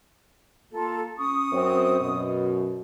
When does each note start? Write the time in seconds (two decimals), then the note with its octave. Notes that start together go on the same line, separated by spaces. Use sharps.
0.72 A#3 F4 A4
1.18 C#4 C#6 D#6
1.52 F#2 C4
2.00 F#2 B2